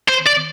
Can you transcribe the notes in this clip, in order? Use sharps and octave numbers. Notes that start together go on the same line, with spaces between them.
C5
D5